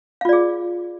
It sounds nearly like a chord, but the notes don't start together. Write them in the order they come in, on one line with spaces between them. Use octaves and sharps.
F5 F4 D5 G#4